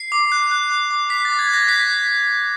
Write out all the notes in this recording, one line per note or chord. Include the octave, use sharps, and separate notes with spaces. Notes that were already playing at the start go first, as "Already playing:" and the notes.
Already playing: C7
D6
F#6
F#6
D6
D6
D6 B6
D6 A6
G#6
F#6 A#6
F#6 B6